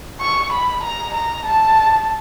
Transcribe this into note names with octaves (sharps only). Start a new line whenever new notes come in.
C#6
B5
A#5
A#5
A5